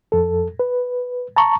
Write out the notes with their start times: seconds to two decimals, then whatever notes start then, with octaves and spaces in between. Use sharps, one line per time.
0.12 F2 A4
0.59 B4
1.36 A5 A#5 C#6